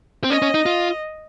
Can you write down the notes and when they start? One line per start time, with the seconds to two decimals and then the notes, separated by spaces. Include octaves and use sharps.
0.24 C4
0.30 C#4 D#5
0.42 C#4
0.54 D#4
0.66 F4